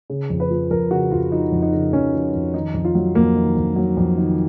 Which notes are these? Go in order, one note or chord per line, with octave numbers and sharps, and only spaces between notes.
C#3
F2
B4
F3
F2 A#4
C#3 F#4
F2 F4
F3 D#4
F2
D#4
C#3
F2 C#4
F3
F2
D#3 D#4
F2
F4
F#3
F2 A#3
D#3
F2
F#3
F2
D#3